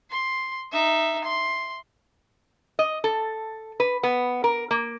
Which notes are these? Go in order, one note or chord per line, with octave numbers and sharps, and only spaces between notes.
C6
D#4 E5
C6
D#5
A4
B4
B3
A#4
A#3